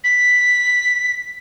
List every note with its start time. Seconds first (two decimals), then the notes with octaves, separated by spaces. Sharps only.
0.04 B6